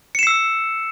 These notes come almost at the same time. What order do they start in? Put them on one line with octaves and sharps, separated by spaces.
C#7 E7 C7 E6